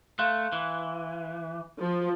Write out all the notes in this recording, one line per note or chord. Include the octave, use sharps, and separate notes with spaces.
A3 F5 C6 F#6
E3
F3